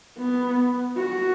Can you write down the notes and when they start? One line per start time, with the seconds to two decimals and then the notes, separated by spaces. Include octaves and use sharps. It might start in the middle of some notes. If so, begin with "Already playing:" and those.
0.18 B3
0.97 F#4